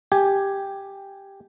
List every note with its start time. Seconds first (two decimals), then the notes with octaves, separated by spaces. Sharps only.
0.12 G4 G#5